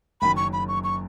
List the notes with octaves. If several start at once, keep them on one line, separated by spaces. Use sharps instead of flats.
F#1 F#2 D#3 B5
C#6
B5
C#6
C#6